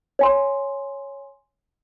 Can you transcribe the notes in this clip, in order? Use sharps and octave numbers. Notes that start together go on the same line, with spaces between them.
C#5 G#5 C6